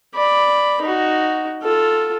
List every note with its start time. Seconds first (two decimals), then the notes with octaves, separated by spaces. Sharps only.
0.15 D5 B5
0.81 D#4 F#4
1.62 F4 A4